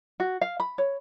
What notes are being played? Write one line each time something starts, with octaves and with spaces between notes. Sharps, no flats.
F#4
F5
B5
C#5